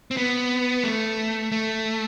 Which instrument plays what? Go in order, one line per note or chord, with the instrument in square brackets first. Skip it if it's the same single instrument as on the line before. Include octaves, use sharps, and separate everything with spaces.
[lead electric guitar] C4
B3
A3
A3